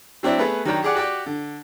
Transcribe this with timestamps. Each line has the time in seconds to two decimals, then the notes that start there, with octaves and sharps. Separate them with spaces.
0.23 F#3 C4 D4 E4
0.38 A3 B3 G#4 B4
0.65 D#3 F#3 D4 G5 A#5
0.83 G4 G#4 D5 F#5
0.95 F#4 G4 D5 G5
1.26 D3